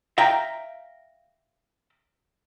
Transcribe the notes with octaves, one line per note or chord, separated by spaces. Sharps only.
E5 F5 G5 A#5